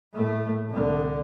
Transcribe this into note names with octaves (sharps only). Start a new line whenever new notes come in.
A2 A3
C2 D3